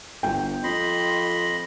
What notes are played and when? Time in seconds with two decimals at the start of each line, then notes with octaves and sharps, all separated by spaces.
0.23 G1 G5
0.64 F2 D#5 B5 C6